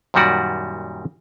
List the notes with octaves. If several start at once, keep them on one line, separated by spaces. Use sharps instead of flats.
F#2 A#2 D#3 G3 F#4 D5